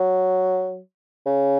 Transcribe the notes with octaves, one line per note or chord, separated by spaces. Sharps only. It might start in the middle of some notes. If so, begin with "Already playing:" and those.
Already playing: F#3
C#3